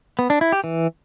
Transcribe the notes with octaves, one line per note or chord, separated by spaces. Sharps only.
B3
D4
E4
G4
E3